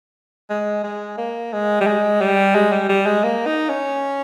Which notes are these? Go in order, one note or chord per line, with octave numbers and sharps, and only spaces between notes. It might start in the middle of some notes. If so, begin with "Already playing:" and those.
G#3
G#3
A#3
G#3
G3
G#3
G3
G#3
G3
G3
G#3
A#3
D#4
C#4